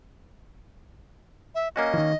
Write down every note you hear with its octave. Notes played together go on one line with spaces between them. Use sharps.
E5
A#3 C#4 F#4 D#5
D#3 E3